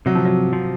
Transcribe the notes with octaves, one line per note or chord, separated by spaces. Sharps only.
C3 F#3
F3
F#3
F3